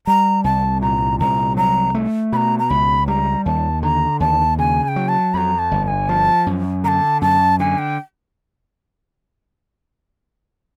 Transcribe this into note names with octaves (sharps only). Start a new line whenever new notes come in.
G3 A#5
C2 A5
A#2 A#5
C2 A#5
F#3 A#5
A3
B2 A#5 B5
A#5
C#2 B5
G3 A#5
D#2 A5
D3 A#5
D#2 A5
C#3 G#5
G#5
G5
F#3
A5
F2 A#5 B5
A5
G1
A5
G#5
F3 A5
F#2
D3 A5 A#5
F#2 A5
D3 G#5
G5